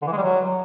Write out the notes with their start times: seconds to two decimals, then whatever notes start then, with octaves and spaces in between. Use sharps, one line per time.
0.02 D3
0.07 E3
0.12 G#3
0.17 G3
0.22 F#3